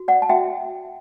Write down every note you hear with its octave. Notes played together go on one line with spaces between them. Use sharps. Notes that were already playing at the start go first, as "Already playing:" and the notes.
Already playing: F#4
D5 F#5
A5
F#4 E5 G5